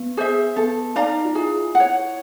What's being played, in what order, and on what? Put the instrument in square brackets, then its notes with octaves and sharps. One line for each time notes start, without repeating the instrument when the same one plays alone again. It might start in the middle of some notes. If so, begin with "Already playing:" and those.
Already playing: [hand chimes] B3
[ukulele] G#4 C5 E5
[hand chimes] B3 [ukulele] A4
[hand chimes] D#4 [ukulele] D5 F5 A#5
[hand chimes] F4
[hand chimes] E4 [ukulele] G#4
[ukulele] F#5
C#5